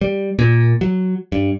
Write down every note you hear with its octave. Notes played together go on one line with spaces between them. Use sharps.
G3
A#2
F#3
G2